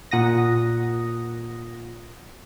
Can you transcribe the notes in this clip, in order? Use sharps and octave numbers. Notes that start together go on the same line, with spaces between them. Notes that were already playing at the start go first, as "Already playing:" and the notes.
A#2 F#5 D#6 A#6